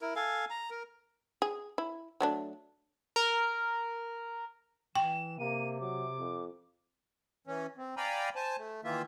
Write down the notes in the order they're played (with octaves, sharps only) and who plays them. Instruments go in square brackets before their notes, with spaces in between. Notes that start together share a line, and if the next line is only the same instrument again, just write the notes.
[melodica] E4 A#4
A4 F5 G#5
A#5
A#4
[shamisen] G#4
E4
F#3 A3 D4
[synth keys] A#4
[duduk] E3 [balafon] G5 [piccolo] E7
[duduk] C3 [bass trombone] A#3 [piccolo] D#7
[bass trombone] F#3 [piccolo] D6
[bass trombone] F2
[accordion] E3 C#4
C4
D5 F5 G5 G#5 A#5 B5
C5 G#5 A5
A3
D#3 E3 A#3 F4 E5